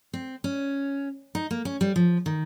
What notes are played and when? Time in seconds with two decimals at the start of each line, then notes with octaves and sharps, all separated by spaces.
0.13 C4
0.44 C#4
1.35 D#4
1.51 A#3
1.65 C#4
1.81 G3
1.96 F3
2.26 D#3